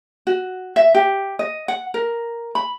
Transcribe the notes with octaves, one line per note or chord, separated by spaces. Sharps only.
F#4
E5
G4
D#5
F#5
A#4
B5